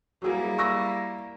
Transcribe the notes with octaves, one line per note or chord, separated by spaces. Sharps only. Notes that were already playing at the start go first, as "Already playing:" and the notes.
F#3 G3 A#3 E4 G#4
C#6 E6 A#6